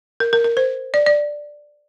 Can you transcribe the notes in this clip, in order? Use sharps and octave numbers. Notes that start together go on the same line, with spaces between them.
A#4
A#4
A#4
C5
D5
D5